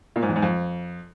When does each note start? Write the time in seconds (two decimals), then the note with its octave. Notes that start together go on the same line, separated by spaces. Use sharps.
0.16 A#2
0.22 G#2
0.29 E2
0.36 G#2
0.42 F2